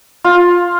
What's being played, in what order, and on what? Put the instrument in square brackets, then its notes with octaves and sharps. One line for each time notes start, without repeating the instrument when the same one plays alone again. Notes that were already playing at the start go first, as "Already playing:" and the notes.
[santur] F4